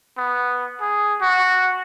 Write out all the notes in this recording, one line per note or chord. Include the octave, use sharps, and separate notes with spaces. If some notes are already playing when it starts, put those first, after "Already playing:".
B3
G#4
F#4